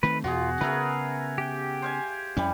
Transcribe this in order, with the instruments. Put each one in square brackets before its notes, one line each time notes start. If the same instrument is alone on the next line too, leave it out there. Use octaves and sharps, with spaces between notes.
[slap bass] D#3 A3 C4 [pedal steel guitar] B4
[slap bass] E2 B2 [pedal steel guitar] F4 [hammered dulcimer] F#4 G#4
[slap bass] C#3 B3 [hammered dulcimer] A3 G#4 [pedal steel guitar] A#4 B4
[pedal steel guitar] G4 G5
[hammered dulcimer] C5 F5 G#5
[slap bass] F2 C#4 [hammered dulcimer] E3 G3